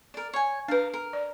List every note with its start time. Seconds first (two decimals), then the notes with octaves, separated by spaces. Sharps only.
0.14 A#4 D5
0.33 C#5 G#5
0.68 D4 A#4 B4 F5
0.94 A#4
1.13 D5